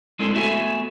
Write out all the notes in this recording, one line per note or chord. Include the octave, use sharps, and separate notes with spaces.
G#3 C4 D4 E4 A4
A3 B3 F#4 E5 F#5 G#5